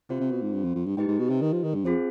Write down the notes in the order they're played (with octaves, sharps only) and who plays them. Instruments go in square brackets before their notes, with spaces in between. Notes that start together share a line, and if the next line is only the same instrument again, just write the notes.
[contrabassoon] C3 [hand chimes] C4 F4 C5
[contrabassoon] C3
B2
G#2
G2
F2
F2
G2
[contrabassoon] G#2 [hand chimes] D#4 G4 B4 D#5 G5
[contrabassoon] G#2
B2
C3
D#3
F3
D#3
G2
[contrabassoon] F2 [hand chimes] C4 F4 G#4 C5